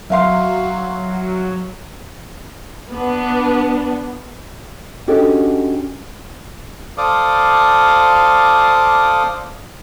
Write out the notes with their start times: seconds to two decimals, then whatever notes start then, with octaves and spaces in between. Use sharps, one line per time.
0.10 F#3 E5 F5 C6
2.92 B3 D4
5.07 C#4 D4 F#4 G4 A4 D#5
6.98 A4 C5 D5 F5 D6 D#6